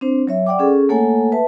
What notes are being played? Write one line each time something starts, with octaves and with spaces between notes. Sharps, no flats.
C4 D4 C5
F#3 C#5 E5
D5 F#5 G5 D6
C#4 G#4 A4
A3 A#3 A4 C#5 F#5 G#5
B4 E5 A5